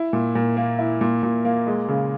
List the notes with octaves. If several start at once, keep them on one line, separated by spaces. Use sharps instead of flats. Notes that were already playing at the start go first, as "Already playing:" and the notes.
Already playing: E4
A#2
A#2
A#3
E4
A#2
A#2
A#3
G#3
C#3